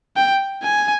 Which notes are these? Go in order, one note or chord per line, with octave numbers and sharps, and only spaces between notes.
G5
G#5